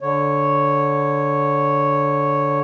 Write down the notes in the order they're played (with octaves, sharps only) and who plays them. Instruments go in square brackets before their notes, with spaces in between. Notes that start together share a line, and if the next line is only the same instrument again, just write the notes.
[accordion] D3 C#5